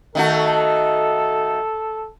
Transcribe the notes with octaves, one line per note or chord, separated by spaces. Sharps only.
D#3 A3 F#4 A4